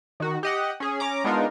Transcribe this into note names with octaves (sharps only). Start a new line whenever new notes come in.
D#3 F#4
G4 D#5 F#5
C#4 G#4
C#4 A#5 D6
G#3 B3 D4 D#4 F4 A#4